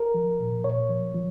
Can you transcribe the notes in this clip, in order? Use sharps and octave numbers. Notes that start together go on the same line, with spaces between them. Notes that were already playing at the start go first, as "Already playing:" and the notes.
Already playing: A#4
F3
A#2
A#2 C#5
F3
F3